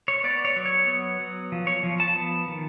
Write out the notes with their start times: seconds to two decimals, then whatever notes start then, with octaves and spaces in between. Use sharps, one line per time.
0.08 C#5
0.24 B3 D5
0.45 C#5
0.56 F#3
0.66 C#5
0.87 B3
1.20 F#3
1.52 F3
1.67 C#5
1.83 F3
2.00 A5
2.15 B3
2.48 D#3